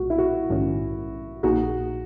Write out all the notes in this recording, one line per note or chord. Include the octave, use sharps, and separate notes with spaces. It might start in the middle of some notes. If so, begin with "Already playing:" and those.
Already playing: B1 A#2 G#3 F#4
E4
F#4
A#1 G#2 D#3 G#3 C#4
A#1 A#2 A#3 D#4 F#4 G#4